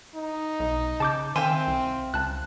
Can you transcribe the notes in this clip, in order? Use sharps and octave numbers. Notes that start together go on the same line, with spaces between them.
D#4
B1
C#3 A5 D6 G6
D#3 C4 E5 F5 G5 G#5 C6
C2
C#2 A5 F#6